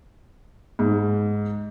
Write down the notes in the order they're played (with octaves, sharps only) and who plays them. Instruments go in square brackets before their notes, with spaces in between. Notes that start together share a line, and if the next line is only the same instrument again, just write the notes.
[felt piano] G#2